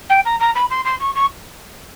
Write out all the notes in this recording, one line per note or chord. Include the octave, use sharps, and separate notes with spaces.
G5
A#5
A#5
B5
C6
C6
C#6
C#6